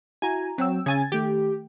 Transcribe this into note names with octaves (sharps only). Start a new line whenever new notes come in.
E4 F#4 G#5 A#5
F#3 C4 G5 E6
C#3 G#5 G#6 A6
D#3 A3 G4